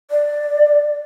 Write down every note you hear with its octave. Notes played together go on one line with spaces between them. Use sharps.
D5